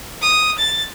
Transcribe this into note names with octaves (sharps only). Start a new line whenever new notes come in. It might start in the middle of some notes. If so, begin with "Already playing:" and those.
D#6
A6